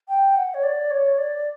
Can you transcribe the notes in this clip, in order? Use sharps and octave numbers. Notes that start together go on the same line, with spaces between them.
G5
F#5
C#5
D5
C#5
D5